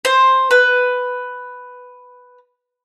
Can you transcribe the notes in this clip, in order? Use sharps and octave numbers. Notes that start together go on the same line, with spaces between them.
C5
B4